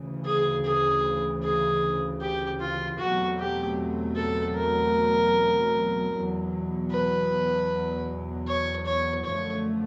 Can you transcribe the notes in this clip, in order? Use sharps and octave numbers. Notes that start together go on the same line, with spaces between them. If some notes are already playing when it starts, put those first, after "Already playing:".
Already playing: D2 C#3 E3
G#4
G#4
G#4
G4
F4
E2 B2 F#3 A3 C4 F#4
G4
A4
A#4
E2 B2 F#3
B4
C#5
C#5
F#2 D3 F3 A3 C#5